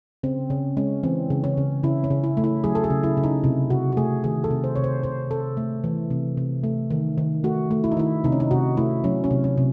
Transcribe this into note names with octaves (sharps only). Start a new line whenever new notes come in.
C#3 C4
C#3 C#4
G#3 C#4
E3 C4
C#3
C#4
C#3
C#3 E4
C#4
C#3
E4
A3
E4
F#3 G#4
A4
G#4
C#3
E4
C#3
D#4
C3 E4
C3 F#4
F#4
A3 G#4
D#3 G#4
A4
C3
C5
C3 C#5
C5
C3 C5
C3 A4
A3
E3
C3
C3
A3
D#3
D#3
A3 F#4
A3
E4
D#4
D#3 E4
C3 D#4
C#4
D#4
C3 F#4
A3 E4
F#3 C#4
C#4
C3
C#4
C3